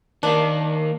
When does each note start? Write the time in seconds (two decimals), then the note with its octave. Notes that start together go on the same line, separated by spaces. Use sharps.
0.23 D#3 A#3 D4